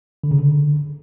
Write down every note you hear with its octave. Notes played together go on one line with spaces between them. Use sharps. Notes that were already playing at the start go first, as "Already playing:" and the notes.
D3
C#3
D3